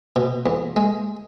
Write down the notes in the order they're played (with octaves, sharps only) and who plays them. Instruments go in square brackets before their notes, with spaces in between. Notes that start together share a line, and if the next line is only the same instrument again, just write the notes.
[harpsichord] B2
E2
G#3